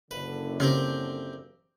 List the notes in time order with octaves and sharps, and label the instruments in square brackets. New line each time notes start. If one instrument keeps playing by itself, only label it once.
[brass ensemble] F#1 D3 [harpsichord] B4
[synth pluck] C#3 [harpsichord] C4 G4 A#4